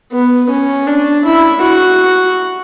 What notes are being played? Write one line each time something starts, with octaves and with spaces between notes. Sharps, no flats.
B3
C#4
D4
E4
F#4